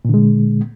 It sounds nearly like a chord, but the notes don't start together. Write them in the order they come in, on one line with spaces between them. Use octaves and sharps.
A#2 D3 G#3